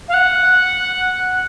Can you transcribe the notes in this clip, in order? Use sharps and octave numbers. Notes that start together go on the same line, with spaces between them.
F5
F#5